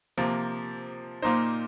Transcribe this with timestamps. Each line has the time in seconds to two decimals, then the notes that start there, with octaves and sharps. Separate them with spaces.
0.18 C3 F3 A#3
1.22 A#2 A#3 D#4 C5